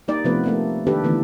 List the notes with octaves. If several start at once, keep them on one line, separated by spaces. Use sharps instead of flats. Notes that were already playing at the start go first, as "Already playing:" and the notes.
G3 A#3 D#4 D5
C3 F3 A3 B3 B4
G3 A3 A#3
D#3 A#3 D4 G4 A4 B4
D3 E3 A3 B3